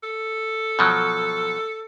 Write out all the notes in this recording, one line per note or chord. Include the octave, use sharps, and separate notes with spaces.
A4
B2 F3 F#3